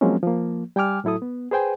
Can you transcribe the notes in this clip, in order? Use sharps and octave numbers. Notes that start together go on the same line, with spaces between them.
F3 F#3 G#3 A#3 C4 C#4
F3 A#3
G3 G5 G#5 D6 F6
A2 F#3 E4 A4 D#6
B3
G#4 B4 C5 G5 G#5